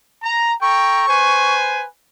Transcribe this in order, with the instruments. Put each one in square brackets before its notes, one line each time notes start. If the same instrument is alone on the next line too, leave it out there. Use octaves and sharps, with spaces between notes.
[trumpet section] A#5
[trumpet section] A4 G5 A#5 [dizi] C#6
[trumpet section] B4 C5 G#5